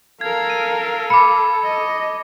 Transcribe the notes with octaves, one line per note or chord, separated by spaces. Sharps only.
A4 A#4 F5 G#6
D#7
B5 D6 C#7
D#5